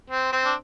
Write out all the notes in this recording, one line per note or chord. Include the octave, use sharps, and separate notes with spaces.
C4
C4
D4